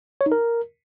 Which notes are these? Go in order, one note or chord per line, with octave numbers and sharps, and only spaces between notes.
C#5
D#4
A#4